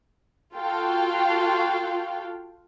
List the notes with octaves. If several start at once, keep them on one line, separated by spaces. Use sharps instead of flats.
F4 F#4 A4 F5 G5